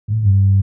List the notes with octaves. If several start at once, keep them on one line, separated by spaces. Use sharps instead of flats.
A2
G2